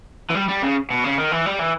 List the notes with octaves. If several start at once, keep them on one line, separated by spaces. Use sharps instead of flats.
E3
G3
G3
C#3
B2
C#3
D#3
E3
G3
E3